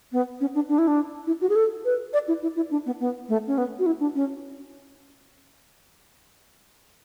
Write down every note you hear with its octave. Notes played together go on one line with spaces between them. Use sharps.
B3
C#4
D4
D4
E4
D4
E4
F#4
G#4
A4
B4
D5
E4
E4
E4
D4
B3
B3
A3
C#4
B3
F#4
E4
D4
C#4